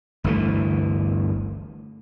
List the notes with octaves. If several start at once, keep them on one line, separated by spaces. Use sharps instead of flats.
G1 D2 E3 A3